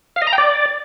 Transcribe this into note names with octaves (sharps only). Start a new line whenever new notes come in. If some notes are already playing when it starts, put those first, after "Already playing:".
F5
D#5
A#5
G5
D5